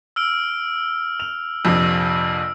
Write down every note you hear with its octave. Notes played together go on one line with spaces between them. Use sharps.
E6 F6 D7
F7
A#1 F2 C3 E6